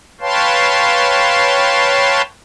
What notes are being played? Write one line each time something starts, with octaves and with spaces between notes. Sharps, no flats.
B4 C#5 F5 G5 A5 C6